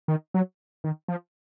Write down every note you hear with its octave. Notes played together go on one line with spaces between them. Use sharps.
D#3
F#3
D#3
F3